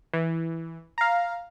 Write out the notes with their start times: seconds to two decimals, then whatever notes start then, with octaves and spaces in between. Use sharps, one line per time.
0.14 E3
0.98 F5 A#5